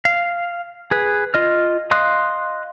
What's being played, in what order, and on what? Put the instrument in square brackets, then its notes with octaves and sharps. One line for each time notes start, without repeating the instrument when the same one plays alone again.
[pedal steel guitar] F5
G#4 B4
F4 D#5 F6
D#5 F5 C6 D#6 F#6